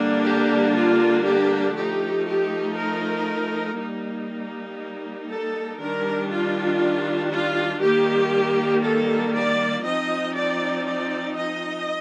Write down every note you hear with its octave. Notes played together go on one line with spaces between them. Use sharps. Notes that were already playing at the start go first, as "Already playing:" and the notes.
Already playing: D3 G3 A#3 D4
G4
F4
G4
F3 A3 D#4 G4
G4
A#4
G3 A#3 D#4
A4
D#3 G3 D4 A#4
F4
F4
D#3 G3 A#3 G4
A4
D5
F3 C4 D#4 D#5
D5
D5
D#5